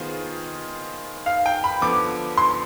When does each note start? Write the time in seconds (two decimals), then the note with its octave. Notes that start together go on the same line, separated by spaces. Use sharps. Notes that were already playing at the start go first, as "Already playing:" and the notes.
Already playing: D#3 B3 F4 G#4 C5
1.26 F5
1.46 G5
1.64 B5
1.81 D3 F3 B3 D6
2.38 C6